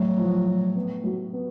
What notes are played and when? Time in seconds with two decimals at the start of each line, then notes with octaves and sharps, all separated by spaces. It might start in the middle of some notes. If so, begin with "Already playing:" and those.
Already playing: A2 F#3
0.17 F3
0.46 A2
0.76 B3
1.04 F#3
1.33 B3